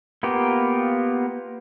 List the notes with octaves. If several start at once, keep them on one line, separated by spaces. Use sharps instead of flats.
A#3 B3 F4 G4